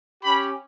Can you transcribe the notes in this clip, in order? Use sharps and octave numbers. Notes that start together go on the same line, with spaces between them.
C#4 G4 B5